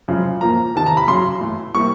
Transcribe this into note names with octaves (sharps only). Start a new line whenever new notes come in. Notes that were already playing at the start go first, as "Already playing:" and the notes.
F#2 C#3 F3 G#3
A#2 F3 A#3 A#5
E2 C3 D#3 A5
A#5
B5
F#2 C#3 F#3 C6
A2 E3 A3
C3 E3 G3 A#3 C#6